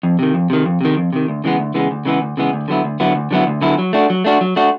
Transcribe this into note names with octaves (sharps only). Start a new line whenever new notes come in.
F2
C3 D#3
F2
C3 D#3
F2
C3 D#3
F2
C3 D#3
D2
C#3 E3 G#3 B3
D2
C#3 E3 G#3 B3
D2
C#3 E3 G#3 B3
D2
C#3 E3 G#3 B3
D2
D3 F#3 B3 E4
D2
D3 F#3 B3 E4
D2
D3 F#3 B3 E4
D2
D3 F#3 B3 E4
F#3
A3 D4 F#4
F#3
A3 D4 F#4
F#3
A3 D4 F#4